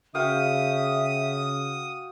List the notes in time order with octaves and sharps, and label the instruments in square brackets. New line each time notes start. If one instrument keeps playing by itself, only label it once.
[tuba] C#3 [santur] F#4 F5 G5 [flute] E5 [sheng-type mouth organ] D#6